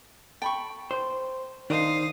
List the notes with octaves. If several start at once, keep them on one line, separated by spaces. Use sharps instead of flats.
G5 A5 B5 C#6
C5
D#3 D4 D#4 A#4 C5 F5 D#6